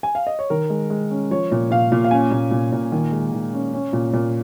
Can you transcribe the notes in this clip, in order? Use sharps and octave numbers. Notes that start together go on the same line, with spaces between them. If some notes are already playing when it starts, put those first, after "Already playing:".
G#5
F5
D#5
C#5
D#3 A#4
G#3
G#3
C#4
F3 C#5
A#2
A#2 F5
A#2
F5
C#4 G#5
A#2
A#2
A#2
D#3
G#3
D#3
C#4
C#4
A#2
A#2